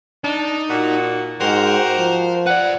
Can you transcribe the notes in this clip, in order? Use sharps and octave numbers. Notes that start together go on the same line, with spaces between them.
D4 D#4
A#2 F#4
G#2 F#4 G4 A#4 C5
F3
B4 D5 F#5